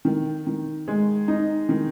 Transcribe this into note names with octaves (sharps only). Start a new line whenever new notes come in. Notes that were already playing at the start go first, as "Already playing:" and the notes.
D#3
D#3
G#3
D#4
D#3